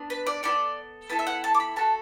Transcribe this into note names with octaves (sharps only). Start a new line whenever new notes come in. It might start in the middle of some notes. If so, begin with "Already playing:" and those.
Already playing: B3 D4
B4
D5
B3 E4 A4 D5
B3 E4 A4 A5
E5
F#5
A5
D6
B5
A3 F#4 A4 A5